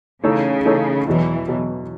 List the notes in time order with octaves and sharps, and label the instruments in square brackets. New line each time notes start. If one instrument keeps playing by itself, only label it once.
[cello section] C#3 [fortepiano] E3 A3 D#4 A4 C#5
[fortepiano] E3 A3 D#4 A4 C#5
[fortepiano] E2 B2 F#3 [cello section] E3
[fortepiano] B2 F#3